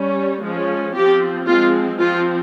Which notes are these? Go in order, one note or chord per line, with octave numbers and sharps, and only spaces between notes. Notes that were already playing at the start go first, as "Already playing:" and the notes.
Already playing: G3 C#4
F3 G#3 C#4
F3 C4 G4
F3 G#3 C4 F4
F3 C4 F4